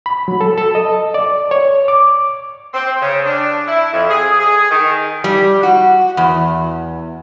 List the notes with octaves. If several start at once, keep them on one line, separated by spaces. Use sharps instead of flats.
B5
F#3
A4
A4
D#5
D5
C#5
D6
C4
C#3
D4
E4
F2
G#4
G#4
D#3
G3
F#4
E2